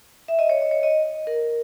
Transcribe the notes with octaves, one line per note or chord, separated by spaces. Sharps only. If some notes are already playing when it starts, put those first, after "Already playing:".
E5
D#5
C#5
D#5
C#5
D#5
A#4